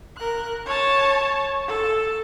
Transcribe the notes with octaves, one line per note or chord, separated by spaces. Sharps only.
A#4 F#6
C#5 A5
A4